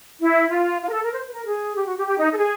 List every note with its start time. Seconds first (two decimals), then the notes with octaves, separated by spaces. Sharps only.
0.19 E4
0.50 F4
0.82 F4
0.88 A#4
0.92 A4
1.03 A#4
1.13 C5
1.27 B4
1.34 A#4
1.44 G#4
1.76 G4
1.87 F#4
1.96 G4
2.07 G4
2.17 D#4
2.32 A4
2.38 G#4